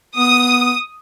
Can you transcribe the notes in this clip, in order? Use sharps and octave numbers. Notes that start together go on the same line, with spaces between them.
B3 D#6